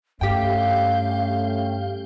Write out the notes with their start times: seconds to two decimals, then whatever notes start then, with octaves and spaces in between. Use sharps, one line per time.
0.21 G2 A3 C#4 G4 F5 G5